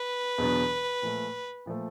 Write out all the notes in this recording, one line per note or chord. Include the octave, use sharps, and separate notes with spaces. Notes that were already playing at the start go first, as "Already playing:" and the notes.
Already playing: B4
E2 B2 F#3 B3 D4
A#2 F3 A3
A#2 F3 A3